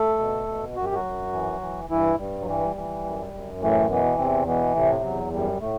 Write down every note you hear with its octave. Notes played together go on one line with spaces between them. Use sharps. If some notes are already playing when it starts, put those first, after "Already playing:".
Already playing: A3 A4
B2
B2
F#2 F#4
G4
F#3 F#4
F#2
E3
E3
G2 E3 E4
G2 G3
F#3
E3 G3
E3
F#2
F#2
A2 E3 A3
B2 E3 B3
E2 C3 C4
B2 E3 B3
A2 C3 A3
E2 F#3
F#2 G3
A2 A3